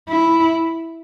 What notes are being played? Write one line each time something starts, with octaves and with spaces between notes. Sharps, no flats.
E4